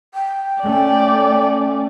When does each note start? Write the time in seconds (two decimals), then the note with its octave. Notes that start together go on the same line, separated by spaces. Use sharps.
0.14 G5
0.64 A3 C#4 D5